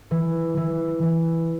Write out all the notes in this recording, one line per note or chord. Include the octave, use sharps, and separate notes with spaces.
E3
E3
E3